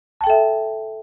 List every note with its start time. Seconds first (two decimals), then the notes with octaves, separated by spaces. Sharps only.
0.21 A5
0.24 G5
0.27 A4
0.30 E5